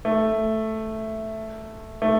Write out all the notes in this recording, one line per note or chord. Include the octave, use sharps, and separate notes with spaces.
A3
A3